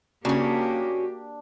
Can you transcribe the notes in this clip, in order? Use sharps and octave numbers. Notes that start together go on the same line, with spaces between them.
C#3 A#3 C#4 D4 F#4 G4